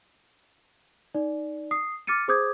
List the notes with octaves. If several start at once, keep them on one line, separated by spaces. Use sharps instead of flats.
D#4 D5
D#6 C7
D6 F6 A6 C#7 D#7
G#4 C5 D6 D#6 G6 G#6